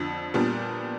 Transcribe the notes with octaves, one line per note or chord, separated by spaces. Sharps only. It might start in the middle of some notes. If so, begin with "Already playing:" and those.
Already playing: F2 D3 F3
A#2 G3 B3 D4